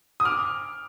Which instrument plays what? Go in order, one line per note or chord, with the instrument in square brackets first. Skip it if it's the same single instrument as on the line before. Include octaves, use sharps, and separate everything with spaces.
[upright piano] D#6
D6 F6